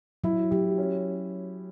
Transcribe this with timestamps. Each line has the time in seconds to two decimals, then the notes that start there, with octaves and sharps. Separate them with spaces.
0.24 F#3 E4
0.51 F#3 G4
0.78 C#4